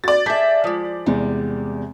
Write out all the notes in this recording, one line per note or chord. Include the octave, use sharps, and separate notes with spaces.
F#4 D5 A6
G#4 E5 A5 G6 B6
F3 G#3
E2 C3 G3 G#3